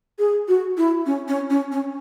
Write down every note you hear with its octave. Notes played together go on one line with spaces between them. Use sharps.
G#4
F#4
E4
C#4
C#4
C#4
C#4